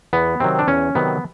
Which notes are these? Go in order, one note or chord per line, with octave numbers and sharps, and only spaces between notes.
E2 B3
C3 D#3 F#3 C4
D4
E2 C#4
C3 D#3 F#3 B3